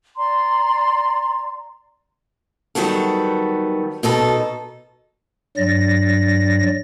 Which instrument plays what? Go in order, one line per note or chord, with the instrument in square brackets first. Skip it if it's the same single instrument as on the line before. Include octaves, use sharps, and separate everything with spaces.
[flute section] D5 A#5 C6
[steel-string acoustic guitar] D#3 F#3 G3 B3 A4
B2 D#4 A4
[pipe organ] G2 F#3 D5 A#6